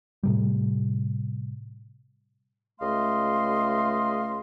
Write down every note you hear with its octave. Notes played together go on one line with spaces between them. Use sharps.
A2 C3 G3
C#2 A3 D#5 F5 C6